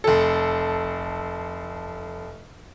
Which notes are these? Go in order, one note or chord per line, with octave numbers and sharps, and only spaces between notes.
F1 A4